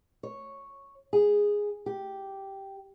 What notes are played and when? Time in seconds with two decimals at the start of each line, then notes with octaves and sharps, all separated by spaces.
0.23 C#5
1.13 G#4
1.86 G4